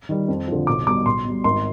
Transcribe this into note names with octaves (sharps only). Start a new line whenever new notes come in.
D#3 G3
F2
D3 F3
B1 D6
B2 G3 D6
B1 C6
B2 G3
G#1 C6